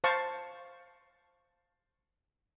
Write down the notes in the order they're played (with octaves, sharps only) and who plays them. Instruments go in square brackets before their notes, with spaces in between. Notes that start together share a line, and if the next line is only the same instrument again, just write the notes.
[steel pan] C5 F5 A5 C#6